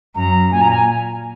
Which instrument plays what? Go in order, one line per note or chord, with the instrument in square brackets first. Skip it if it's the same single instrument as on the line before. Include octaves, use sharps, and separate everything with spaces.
[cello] F#2 [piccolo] A#5
[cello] A#2 [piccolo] G#5
[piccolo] A#5
G#5